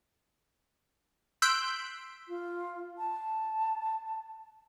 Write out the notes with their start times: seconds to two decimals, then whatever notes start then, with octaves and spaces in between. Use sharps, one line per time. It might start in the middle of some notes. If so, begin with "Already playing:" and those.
1.42 C6 E6 F#6 G6 B6 D7
2.28 F4
2.98 A5